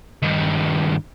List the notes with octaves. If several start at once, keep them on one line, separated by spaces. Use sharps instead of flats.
G2 D#3